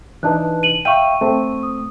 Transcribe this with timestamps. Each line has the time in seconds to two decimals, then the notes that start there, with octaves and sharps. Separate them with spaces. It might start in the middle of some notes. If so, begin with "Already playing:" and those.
0.23 E3 D4 D#4 B4 A5 F#6
0.63 D#7 F#7
0.85 E5 F5 G5 C#6 D#7
1.21 A3 C4
1.63 D#6